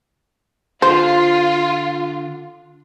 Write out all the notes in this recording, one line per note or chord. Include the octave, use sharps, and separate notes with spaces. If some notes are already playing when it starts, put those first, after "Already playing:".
D3 F4 C5